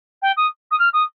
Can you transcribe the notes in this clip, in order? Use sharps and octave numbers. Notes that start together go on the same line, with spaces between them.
G5
D#6
D#6
F6
D#6